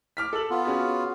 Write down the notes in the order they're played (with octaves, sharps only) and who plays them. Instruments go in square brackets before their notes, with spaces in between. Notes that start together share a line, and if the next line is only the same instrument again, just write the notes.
[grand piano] D6 F6 B6
A4 E6 F#7
[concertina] B3 F4
[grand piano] C#4 F#4 G#4